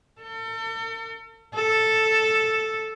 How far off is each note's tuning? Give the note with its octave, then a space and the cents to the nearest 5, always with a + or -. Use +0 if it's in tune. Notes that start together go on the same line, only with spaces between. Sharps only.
A4 +40
A4 +0